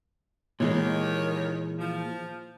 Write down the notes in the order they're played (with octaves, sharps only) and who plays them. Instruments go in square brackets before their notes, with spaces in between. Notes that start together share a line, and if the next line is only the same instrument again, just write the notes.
[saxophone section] D#2 D#3 C#5 [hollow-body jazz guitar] A#2 E3 G#3
[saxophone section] F3